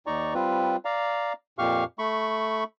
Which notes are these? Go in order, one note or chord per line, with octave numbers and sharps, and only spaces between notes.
D#2 D#4 D5 A#5 C#6
G3 C4 F4 B4
D5 F5 A#5
F2 A#2 G4 F5 C#6 F6
A3 B5 C#6